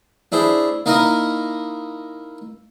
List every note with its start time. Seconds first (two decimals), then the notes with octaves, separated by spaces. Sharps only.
0.32 D4 E4 G#4 C5
0.86 A#3 D#4 E4 A#4 D#5